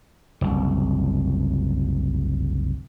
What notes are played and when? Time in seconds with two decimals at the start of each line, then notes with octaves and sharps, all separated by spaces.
0.41 F#1 C2